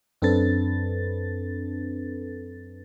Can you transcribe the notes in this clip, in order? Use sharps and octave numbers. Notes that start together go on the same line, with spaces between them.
F#2 C4 D4 A4 B4 A6